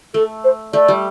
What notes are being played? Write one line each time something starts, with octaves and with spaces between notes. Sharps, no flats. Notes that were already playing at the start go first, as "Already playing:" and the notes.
A3 A4
C5
A3 D5
G3